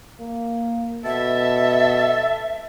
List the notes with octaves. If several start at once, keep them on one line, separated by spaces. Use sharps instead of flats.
A#3
B2 A4 E5